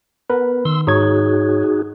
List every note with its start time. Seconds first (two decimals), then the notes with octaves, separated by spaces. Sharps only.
0.30 B3 A#4 B4
0.65 D#3 C6 E6
0.87 G#2 D#4 F#4 G#4 C#5 G#6